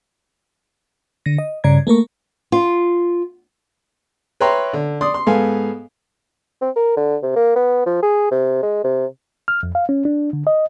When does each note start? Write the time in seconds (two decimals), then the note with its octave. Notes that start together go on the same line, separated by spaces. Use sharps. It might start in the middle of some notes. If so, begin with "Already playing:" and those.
1.26 D3 A#6
1.38 D#5
1.64 G2 C#3 D5 A#5 G#6
1.87 A3 A#3 A#4 C#6
2.52 F4
4.40 B4 C#5 E5 G5 A#5 C6
4.73 D3
5.01 D5 C6 D#6
5.14 C6
5.27 G#2 B3 A4 F5 G#5
6.62 C4
6.76 A#4
6.97 D3
7.23 C3
7.36 A#3
7.56 B3
7.86 F3
8.03 G#4
8.31 C3
8.63 G#3
8.84 C3
9.48 F6
9.63 F2
9.75 F5
9.89 C#4
10.05 D4
10.33 D3
10.47 D#5